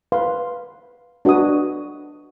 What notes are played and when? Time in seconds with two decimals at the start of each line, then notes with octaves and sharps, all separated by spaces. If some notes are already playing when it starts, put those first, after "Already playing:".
0.12 B4 F5 C6
1.25 D4 F#4 B4 D#5 D#6